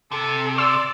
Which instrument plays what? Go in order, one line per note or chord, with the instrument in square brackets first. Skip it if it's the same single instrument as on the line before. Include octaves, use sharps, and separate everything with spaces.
[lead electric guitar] C3 [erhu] A4
[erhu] D5 [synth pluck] C6 E6